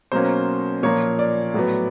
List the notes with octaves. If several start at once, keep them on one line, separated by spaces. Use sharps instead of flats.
B2 F#3 A#3 C#4 C5
A#2 F3 A#3 C#5
D5
A2 F#3 B3